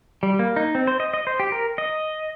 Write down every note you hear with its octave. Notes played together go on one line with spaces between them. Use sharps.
G3
A#3
D#4
C4
C5
D#5
D#5
C5
G4
A#4
D#5